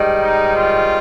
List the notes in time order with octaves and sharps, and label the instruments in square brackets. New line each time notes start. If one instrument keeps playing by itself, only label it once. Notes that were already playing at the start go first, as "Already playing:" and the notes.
Already playing: [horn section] G#2 D#3 G3
D#4
F4